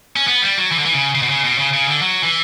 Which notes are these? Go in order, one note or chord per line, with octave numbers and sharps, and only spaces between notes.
C#4
B3
G3
F#3
E3
D3
E3
C#3
C#3
B2
C#3
B2
C#3
C#3
D3
F#3
E3